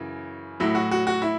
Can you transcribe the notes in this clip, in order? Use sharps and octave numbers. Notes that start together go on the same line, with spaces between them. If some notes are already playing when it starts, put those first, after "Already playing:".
Already playing: F#2 C#3 E3
A2 F#3 E4
F#4
F#4
F#4
E4